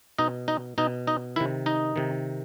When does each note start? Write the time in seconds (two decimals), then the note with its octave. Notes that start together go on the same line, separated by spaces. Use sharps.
0.18 B2 D#4 D#5
0.48 D#4 D#5
0.78 B2 D#4 D#5
1.07 D#4 D#5
1.36 C3 D#3 E4 E5
1.66 D#4 D#5
1.96 C3 D#3